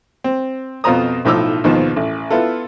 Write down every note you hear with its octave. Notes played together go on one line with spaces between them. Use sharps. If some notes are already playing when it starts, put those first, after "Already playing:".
C4
F2 B2 F4 C5 A#5 D#6
B1 A2 F3 D#4 D6 E6
D#2 G#2 B2 F3
A1
B3 E4 F4 A4